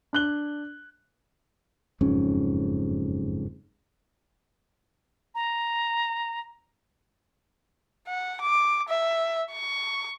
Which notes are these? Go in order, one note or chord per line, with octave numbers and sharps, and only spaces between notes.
D4 F#6 G7
F#1 F2 G#2 C#4
A#5
F#5
D6
E5
C#6